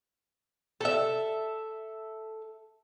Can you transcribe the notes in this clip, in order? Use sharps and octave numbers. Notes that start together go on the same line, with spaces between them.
A4 E5